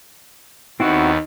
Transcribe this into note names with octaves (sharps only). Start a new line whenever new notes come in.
D#2 B3 C4 D#4 E4 F#4